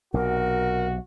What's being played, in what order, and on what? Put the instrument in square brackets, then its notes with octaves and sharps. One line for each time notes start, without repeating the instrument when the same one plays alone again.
[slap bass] B1 C3 [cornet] F#4 [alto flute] A#4